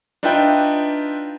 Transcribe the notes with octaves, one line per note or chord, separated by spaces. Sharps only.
D4 D#4 F4 B4 E5 G5